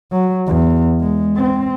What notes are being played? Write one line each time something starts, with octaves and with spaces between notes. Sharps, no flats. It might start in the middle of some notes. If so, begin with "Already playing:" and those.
F#3
E2
G#3
C4